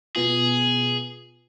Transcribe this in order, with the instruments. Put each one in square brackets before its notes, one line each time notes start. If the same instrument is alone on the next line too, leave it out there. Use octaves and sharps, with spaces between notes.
[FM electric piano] B2 B3 F4 [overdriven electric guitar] G#4